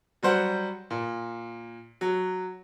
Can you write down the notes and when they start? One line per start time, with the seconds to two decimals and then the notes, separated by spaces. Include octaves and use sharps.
0.23 F#3 G3 C5 F#5
0.90 A#2
2.01 F#3